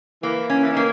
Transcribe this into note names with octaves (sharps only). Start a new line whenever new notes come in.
E3 A#3
C#4
E3
D#3
A#3